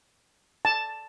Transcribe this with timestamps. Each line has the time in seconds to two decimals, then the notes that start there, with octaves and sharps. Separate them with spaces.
0.65 A5